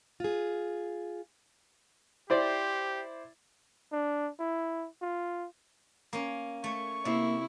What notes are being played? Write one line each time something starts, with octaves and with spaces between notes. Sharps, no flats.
F4 G#4
E4 G4 C5 D5
D4
E4
F4
A#3 C#4
A3 C#6
C3 A#3 E4